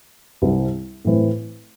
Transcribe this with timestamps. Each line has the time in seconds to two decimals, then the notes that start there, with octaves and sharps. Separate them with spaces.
0.42 C2 C3 G3 C4
1.05 A2 E3 C4